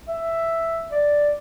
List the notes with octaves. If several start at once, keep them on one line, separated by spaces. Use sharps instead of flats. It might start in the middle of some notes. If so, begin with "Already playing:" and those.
E5
D5